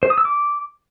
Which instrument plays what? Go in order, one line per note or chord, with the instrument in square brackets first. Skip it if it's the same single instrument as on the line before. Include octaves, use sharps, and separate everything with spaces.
[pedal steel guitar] C5
D#6
E6
D6